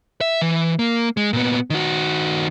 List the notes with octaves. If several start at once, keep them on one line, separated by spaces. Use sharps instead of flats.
E5
E3
A#3
G#3
A#2 B3
D#3 F#4